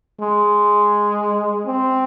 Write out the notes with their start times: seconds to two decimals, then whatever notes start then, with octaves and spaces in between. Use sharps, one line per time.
0.21 G#3
1.67 C4